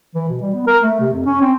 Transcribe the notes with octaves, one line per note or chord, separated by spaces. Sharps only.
E3
B2
G3
B3
A#4
A3
C3
F2
C#4
C4